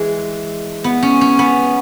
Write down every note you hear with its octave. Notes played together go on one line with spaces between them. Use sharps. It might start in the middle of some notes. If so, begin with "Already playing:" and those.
Already playing: E3 G#3
B3
C#4
C#4
B3